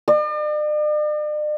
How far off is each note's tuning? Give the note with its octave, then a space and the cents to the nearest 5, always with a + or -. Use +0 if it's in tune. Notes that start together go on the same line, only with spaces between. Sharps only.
D5 +45